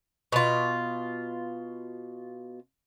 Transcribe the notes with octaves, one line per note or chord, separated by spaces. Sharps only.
B2 F4